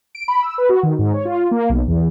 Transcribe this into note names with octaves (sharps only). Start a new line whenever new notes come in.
D7
B5
E6
B4
F#4
D#3
G#2
C#5
F4
A#3
B1
E2